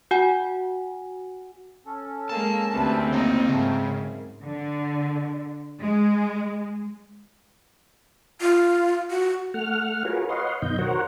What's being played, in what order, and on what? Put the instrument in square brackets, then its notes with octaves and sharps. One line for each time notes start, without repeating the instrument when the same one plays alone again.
[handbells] F#4 F#5 G#5
[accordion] C#4 A4
[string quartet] G#3 A#3 [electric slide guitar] A5
[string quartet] D2 C3 B4 [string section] C4
[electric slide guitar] C#3 A#3 [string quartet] D#4
[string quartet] G#2 [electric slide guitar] C#3 [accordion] F3 A3 A#3
[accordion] F#2
[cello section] D3
G#3
[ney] F4
F#4
[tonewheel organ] A3 F#5 F6
F4 F#4 G#4 A#4 B4 C#5
B4 C#5 D#5 F5 F#5 C6
F#2 B2 D#3 D#5 G6
F#4 A#4 C5 C#5 F#5